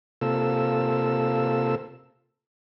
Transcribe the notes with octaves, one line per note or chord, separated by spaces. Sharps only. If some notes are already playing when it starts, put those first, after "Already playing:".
C3 A#3 F4 A4 E6